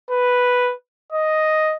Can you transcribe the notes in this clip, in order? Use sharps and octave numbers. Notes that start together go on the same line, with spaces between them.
B4
D#5